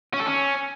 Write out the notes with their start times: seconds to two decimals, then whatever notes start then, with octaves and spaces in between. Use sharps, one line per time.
0.14 C#4
0.20 A4
0.26 C#4